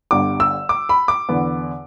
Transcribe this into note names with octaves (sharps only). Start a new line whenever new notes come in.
G1 G2 D3 D6
E6
D6
B5
D6
E2 D3 B3